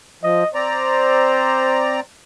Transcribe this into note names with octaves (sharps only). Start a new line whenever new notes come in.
F3 D#5
C4 C5 D5 A#5